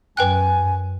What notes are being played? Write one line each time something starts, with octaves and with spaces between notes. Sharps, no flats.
F#2 B4 G5 G#5 F#6